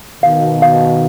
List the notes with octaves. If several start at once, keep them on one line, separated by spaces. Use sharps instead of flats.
B2 D#3 F5
F5